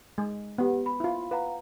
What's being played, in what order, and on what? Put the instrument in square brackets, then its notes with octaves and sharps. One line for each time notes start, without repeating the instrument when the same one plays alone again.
[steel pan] G#3
[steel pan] B3 [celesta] G4 F#5
[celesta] B5
[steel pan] E4 F4
[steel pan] B4 [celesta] F5 F#5 A#5